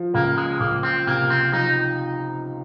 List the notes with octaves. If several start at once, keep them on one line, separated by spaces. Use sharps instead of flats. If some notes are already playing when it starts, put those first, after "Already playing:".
Already playing: F3
C#2 A#3
G#3
C#2 A#3
C4
C3 A#3
C4
F3 D#4